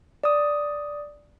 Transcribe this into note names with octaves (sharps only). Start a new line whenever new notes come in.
D5 D#6